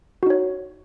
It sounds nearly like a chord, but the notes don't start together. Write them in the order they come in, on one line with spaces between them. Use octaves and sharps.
F#4 D#4 C#5